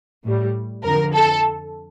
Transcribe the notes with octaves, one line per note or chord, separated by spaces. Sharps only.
A2 G3
F2 D3 F3 A#4
A4